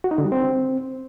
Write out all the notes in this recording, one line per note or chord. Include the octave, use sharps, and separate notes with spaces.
F#4
D#4
D3
G3
C4